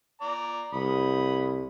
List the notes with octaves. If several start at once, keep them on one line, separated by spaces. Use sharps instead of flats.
D5 A#5
C2 B5 D#6